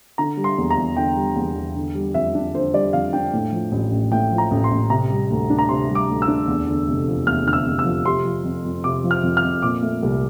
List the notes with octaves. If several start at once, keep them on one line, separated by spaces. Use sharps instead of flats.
D3 A#5
G3
C6
E2
A#5
E2
D3 G5
G3
E2
E2
D3
G3
F2 E5
D4
D3 C5
G3 D5
F2 F5
D4 G5
A2
F3
A1
A1
A2 G5
F3
A#5
A1
C6
A1
C3 A#5
G3
D2
D4
A#5
C3 C6
G3
D6
D2
E6
D4
E2
D3
F1
F3
E2 F6
D3 F6
E6
F1
E6
F3
C3 C6
F3
F2
F2
C3 D6
F3
F6
F2
F6
F2
A#2 D6
A3
C2